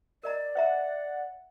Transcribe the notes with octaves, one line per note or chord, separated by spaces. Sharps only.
A#4 D5 D#5 A#5
C5 E5 F#5 A#5